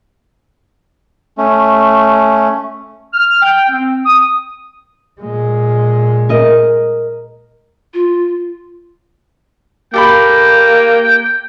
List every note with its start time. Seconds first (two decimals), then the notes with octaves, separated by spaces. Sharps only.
1.38 A3 C#4
3.14 F6
3.42 G5
3.69 C4
4.06 D#6
5.21 A#2 G#3
6.29 A#4 D#5
7.94 F4
9.94 A#3 G4 A4 G5 B5